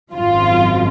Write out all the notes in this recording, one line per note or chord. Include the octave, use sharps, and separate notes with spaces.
G#1 F#2 F3 F4